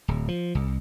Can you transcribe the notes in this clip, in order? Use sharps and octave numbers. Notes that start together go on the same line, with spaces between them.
D1
F3
C2